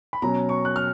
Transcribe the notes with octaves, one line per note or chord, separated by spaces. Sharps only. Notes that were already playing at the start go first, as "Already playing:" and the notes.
B5
B2 F#3 C#4 A#5
C#6
F#6
F6